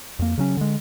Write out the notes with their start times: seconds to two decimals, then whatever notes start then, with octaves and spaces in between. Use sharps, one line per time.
0.19 F2 A#3
0.37 C#3 F#3 C#4
0.57 D3 G#3